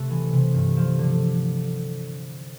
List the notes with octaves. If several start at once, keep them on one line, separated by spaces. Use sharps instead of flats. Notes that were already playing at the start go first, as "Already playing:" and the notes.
Already playing: C3 A3 B4
E3
C3
G2
F3
D3